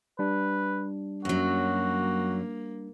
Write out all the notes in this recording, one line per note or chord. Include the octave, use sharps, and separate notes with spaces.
G3 D4 B4
F#2 F#3 A#3 F#4